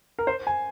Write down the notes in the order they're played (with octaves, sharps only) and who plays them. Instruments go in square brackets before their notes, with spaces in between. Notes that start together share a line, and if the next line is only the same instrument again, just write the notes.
[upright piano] A#4
C5
G#5